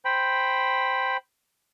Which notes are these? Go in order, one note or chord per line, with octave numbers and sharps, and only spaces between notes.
C5 G5 B5